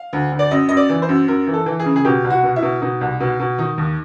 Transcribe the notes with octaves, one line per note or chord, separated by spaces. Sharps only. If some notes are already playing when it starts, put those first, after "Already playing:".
Already playing: F5
D2
D2
D5
F#2 D#5
F#2 D#5
D5
E3
C5
F#2
F#2 A#4
E3
A4
E3
G#4
C#3
G#4
B2 G4
C2
F#4
B2
E4
B2
B2 D#4
C2
B2
B2
D#3 D#4
D#2